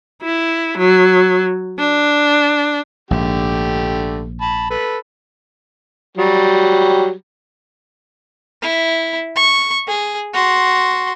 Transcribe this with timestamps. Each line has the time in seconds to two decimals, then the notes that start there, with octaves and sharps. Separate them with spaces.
0.22 E4
0.78 F#3
1.79 D4
3.11 A#1 G#2 D3 A3 G4
4.41 A5 B5
4.70 A4 B4
6.17 F#3 G3
8.62 E4
9.36 C#6
9.88 G#4
10.34 F#4 C6